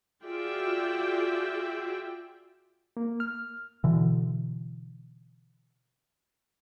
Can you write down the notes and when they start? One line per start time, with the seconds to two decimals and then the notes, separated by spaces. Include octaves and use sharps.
0.23 F4 F#4 G#4 D5 E5 G5
2.97 A#3
3.20 F6
3.84 B2 D3 E3